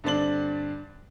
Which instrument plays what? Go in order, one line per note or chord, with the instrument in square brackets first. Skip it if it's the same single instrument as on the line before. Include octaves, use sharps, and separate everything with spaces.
[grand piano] G2 D3 C4 D4 A6 F#7